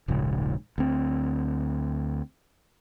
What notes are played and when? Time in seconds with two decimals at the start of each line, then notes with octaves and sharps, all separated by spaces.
0.08 D#1 A#1 G#2 C#3
0.78 D2 C4